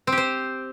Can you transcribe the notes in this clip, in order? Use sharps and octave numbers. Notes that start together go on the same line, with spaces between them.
C4
G4
C5